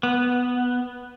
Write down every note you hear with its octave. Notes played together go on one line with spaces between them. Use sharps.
B3